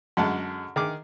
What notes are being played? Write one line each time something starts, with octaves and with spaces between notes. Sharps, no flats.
F#2 D3 G#3 F#5 A5
D#3 G#4 D6